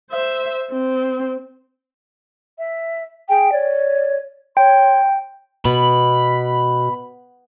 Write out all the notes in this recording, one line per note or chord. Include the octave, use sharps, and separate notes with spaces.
C5 E5
C4
E5
G#4 G5 G#5
C#5 D5
C#5 G5 C6
B2 B5